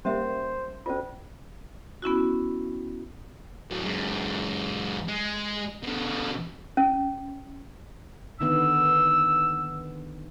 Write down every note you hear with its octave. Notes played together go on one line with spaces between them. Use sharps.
G3 A#3 C#4 C5 E5
D2 C#4 F4
B3 C#4 E4 F#4
A2 F#3
F#2 G#3
G#3
B2 D3
C#4
D3 D#3 B3 E6